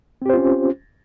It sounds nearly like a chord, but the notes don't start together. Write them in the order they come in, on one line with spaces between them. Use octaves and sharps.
C4 G4 C5 F4 C#4